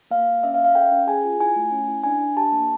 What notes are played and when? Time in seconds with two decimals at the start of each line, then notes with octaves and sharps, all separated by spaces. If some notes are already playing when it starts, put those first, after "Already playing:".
0.11 A#3 F5
0.27 A#3
0.43 C#4 E5
0.54 F5
0.59 C#4
0.65 F5
0.75 A4 G5
0.92 C#4
1.07 G#4 G#5
1.24 F4
1.39 E4 G#5
1.56 A3
1.71 C#4
1.88 E4
2.04 D4 G#5
2.21 D4
2.37 G4 A5
2.53 A#3